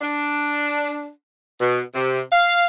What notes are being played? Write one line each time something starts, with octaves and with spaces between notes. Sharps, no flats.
D4
B2
C3
F5